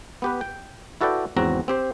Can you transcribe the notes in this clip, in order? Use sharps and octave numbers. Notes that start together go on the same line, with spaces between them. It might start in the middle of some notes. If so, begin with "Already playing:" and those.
B3 G4 B4
G5
E4 F#4 A4 B4 D5 G5
G#1 E2 C#3 C4 F#4 A#5
C4 G4 C5